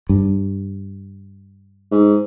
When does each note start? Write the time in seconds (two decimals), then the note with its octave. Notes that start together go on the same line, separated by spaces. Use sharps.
0.09 G2
1.91 G#2